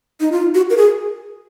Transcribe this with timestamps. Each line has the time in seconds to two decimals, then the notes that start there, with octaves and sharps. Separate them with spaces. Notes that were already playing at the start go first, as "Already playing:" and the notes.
0.21 D#4
0.32 F4
0.55 F#4
0.70 A#4
0.77 G#4